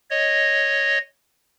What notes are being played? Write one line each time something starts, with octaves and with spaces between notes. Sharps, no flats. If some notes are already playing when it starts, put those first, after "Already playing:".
C#5 D#5